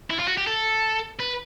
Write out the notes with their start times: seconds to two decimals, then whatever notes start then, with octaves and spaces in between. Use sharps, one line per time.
0.10 E4
0.19 F4
0.28 F#4
0.37 G4
0.47 A4
1.19 B4